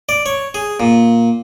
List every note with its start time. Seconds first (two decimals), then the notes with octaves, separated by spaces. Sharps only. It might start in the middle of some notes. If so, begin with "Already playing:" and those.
0.09 D5
0.26 C#5
0.54 G#4
0.80 A#2